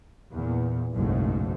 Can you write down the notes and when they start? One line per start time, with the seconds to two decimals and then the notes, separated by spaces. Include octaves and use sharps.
0.34 E2 A#2
0.94 F#1 B1 G#2 A3